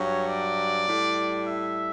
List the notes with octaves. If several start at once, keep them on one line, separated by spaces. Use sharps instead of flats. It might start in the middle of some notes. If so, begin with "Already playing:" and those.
Already playing: G2 F#3 C#5
D5
A2 G3
E5